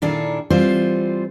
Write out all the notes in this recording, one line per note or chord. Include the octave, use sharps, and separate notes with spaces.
A#2 D#3 D4 E4 G#4 A4
E3 G3 C4 F4 C5